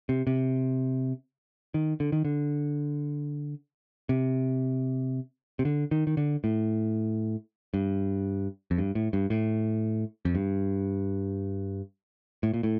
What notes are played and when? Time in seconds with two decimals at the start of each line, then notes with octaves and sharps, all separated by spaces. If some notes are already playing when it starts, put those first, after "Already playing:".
0.09 C3
0.27 C3
1.74 D#3
2.00 D3
2.12 D#3
2.25 D3
4.09 C3
5.59 C3
5.65 D3
5.91 D#3
6.07 D#3
6.17 D3
6.44 A2
7.74 G2
8.71 F2
8.78 G2
8.95 A2
9.13 G2
9.30 A2
10.25 F2
10.35 G2
12.43 A2
12.54 A#2
12.63 A2